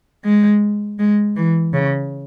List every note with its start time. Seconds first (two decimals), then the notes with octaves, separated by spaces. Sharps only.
0.24 G#3
0.99 G#3
1.36 E3
1.73 C#3